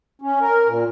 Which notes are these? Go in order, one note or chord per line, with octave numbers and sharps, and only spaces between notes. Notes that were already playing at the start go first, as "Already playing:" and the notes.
C#4
A#4
A#2